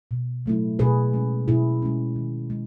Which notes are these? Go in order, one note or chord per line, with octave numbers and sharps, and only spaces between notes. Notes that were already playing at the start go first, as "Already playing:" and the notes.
B2
F#3 A3 E4
B2 G#4 B4
G#3 C#4
B2 E4 G#4
G#3 C#4
D#3
G#3